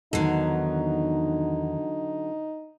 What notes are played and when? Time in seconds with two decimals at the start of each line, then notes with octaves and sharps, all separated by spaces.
0.13 E2 D3 D#3 F#3 D#4